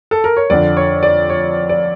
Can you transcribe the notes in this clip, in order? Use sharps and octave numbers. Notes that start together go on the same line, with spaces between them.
A4
A#4
C#5
F2 D3 D5
C#5
D5
C#5
D5